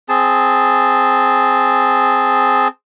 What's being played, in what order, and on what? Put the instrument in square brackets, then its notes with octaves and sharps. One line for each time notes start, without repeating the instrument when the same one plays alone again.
[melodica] C4 G#4 A5